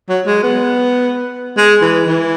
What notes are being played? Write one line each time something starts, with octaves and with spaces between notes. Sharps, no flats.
F#3
G#3
B3
G#3
E3
E3